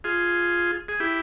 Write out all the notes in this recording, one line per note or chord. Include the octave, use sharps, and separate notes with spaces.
F4 G#4
G#4
E4 G4